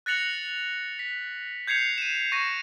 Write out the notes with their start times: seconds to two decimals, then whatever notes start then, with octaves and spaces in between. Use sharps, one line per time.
0.06 F#6 A6 A#6 C#7 F7 F#7
0.99 B6
1.67 G6 G#6 C7 C#7 F7
1.98 D#7 E7
2.32 C#6 A#6 D#7